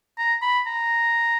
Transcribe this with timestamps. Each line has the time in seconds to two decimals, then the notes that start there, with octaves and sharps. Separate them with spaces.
0.18 A#5
0.42 B5
0.67 A#5